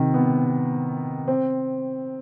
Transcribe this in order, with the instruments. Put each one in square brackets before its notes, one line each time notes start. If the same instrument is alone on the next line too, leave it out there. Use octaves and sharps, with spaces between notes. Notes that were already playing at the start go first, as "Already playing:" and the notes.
Already playing: [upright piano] C3 D#3
B3
C4